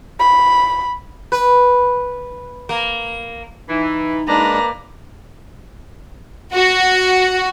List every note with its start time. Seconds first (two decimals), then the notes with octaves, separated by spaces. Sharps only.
0.20 B5
1.32 B4
2.69 A#3
3.69 E3 D#4
4.28 G#3 A#3 D4 B4 D5 A#5
6.53 F#4